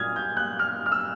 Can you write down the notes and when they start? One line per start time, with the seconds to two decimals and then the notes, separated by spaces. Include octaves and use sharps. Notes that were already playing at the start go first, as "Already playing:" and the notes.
Already playing: A#2 F#3 D#6 F6 G#6
0.16 G6
0.37 F#6
0.59 F6
0.86 F6
0.92 E6